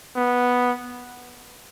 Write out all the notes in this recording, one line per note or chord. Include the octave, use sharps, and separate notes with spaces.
B3